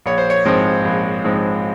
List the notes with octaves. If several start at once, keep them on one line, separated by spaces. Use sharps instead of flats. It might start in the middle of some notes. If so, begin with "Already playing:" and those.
A#1 C#5
C5
C#5
G#2 F3 G#3 C4
A#1
G#2 F3 G#3 C4